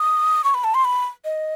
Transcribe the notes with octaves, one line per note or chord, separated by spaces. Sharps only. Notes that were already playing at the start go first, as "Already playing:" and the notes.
Already playing: D#6
C#6
B5
A5
C6
B5
D#5